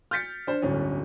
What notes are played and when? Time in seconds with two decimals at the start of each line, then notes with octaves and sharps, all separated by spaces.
0.11 F6 G6 A6 B6 C#7
0.47 D4 C5
0.62 D1 G1 C#4